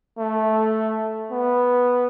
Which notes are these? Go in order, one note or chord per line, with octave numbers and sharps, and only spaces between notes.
A3
B3